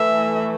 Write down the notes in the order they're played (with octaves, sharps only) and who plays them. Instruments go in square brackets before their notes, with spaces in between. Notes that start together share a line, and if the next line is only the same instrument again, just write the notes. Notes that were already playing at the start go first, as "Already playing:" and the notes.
Already playing: [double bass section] E3 A3 [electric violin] E5